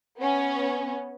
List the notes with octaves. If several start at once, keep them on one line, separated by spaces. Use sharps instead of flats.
B3 C#4